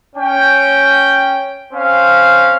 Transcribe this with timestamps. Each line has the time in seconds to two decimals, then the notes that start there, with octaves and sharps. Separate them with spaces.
0.16 C#4 G5
1.73 C4 C#4 F5